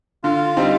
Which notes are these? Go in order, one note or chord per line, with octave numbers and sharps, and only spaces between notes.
D3 F4
G3 C4 D#4